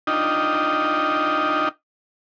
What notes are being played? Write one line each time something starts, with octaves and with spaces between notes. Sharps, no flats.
D4 D#4 F4 D#5 G5